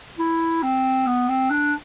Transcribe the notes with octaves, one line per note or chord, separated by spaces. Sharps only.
E4
C4
B3
C4
D4